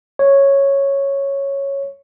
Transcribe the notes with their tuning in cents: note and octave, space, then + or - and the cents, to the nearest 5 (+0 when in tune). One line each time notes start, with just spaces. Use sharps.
C#5 -5